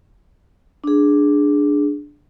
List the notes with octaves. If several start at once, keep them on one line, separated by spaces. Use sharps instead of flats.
D4 G#4